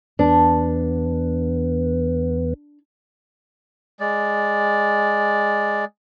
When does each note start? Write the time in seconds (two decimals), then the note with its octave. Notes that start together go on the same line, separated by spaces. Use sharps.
0.19 E2 B3 D4
4.00 G#3 D5